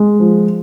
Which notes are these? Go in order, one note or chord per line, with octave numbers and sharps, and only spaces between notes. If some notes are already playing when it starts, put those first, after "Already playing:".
Already playing: G#3
F3